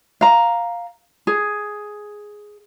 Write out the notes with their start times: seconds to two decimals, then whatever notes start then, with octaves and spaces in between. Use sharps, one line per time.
0.21 F5 A#5
1.27 G#4